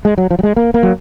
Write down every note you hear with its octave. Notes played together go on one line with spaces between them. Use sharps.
G#3
F#3
F3
F#3
G#3
A#3
A#3
F#3